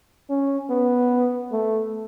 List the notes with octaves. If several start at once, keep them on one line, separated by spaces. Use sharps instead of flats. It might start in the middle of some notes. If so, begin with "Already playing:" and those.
C#4
B3
A3